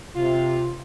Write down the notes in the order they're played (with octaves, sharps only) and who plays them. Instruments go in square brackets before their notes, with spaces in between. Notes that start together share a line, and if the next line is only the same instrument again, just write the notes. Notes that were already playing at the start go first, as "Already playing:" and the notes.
[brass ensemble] C3 [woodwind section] F4